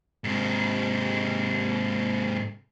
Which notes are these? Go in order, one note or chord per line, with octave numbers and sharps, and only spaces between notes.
G#2 C3